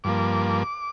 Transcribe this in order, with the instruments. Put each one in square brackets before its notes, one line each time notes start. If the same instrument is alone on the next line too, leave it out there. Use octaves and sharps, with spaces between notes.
[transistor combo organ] G2 F3 A#3 D6